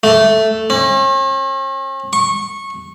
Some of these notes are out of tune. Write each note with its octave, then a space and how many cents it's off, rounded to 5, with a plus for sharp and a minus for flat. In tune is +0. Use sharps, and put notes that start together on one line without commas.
A3 +0
C#4 -45
C#6 -20